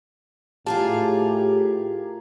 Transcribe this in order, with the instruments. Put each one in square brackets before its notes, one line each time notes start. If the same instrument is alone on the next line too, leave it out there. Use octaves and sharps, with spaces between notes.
[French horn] A2 [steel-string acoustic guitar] F4 G#4 A#4 [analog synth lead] G4 [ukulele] A5